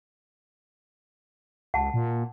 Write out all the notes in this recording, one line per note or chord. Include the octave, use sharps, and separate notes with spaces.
C#2 F#5 A5
A#2